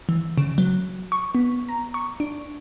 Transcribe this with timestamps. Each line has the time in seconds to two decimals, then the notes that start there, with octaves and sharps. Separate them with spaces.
0.09 E3
0.38 C#3
0.58 F#3
1.12 C#6
1.35 B3
1.69 A#5
1.94 C#6
2.20 D4